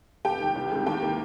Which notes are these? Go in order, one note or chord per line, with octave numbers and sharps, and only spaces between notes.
F1 G4 G5
D#2 D#3
C2
C3 D#3 G#3
D#2 G4 G5
D#3 A#3